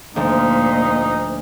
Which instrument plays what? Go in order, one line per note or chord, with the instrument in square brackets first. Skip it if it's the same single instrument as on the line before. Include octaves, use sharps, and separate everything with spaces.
[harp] D2 F3 [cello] A#2 [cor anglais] D#4